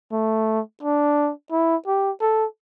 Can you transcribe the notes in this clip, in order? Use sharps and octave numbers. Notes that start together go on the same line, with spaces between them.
A3
D4
E4
G4
A4